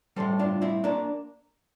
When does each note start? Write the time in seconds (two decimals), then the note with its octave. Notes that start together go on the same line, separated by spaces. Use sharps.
0.16 A2 G3 A4 C5
0.39 D4 F4
0.62 C4 E4
0.84 A#3 D4